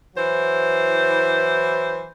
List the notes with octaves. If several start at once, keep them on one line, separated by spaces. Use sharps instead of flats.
E3 F#3 E4 C5